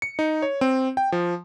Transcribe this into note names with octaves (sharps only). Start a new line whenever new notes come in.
C#7
D#4
C#5
C4
G5
F3